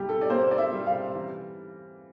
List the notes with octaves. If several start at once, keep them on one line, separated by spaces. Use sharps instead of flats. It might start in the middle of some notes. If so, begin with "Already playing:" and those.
Already playing: C3 G3 G4
A4
D5
A#3 C5
D5
E5
G3
F5
E3